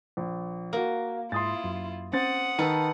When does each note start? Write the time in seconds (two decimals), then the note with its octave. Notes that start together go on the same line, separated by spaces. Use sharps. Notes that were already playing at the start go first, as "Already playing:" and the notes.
0.17 A#1
0.73 A#3 F#4 A#4
1.32 G#2 E4 F4 C6 D#6 A6
1.64 F#2
2.13 C4 C#4 C5 F#5 D#6 A6
2.59 D#3 A4 B4